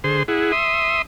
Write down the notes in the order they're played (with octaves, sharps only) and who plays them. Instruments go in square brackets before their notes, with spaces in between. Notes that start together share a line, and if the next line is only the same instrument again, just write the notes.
[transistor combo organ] D3 G#4 C5 C6
E4 G#4 F#5
E5 C6 D#6